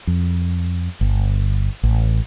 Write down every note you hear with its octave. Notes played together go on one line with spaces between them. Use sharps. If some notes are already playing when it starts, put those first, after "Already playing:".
F2
G1
A1